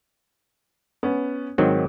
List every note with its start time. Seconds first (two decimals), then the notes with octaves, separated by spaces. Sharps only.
1.03 B3 C#4
1.58 G#2 D#3 F#3 C4